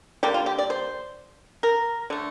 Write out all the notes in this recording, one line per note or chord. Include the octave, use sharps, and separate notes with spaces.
D3 G3 A#3 G4
F4
G4
D5
C5
A#4
D3 A3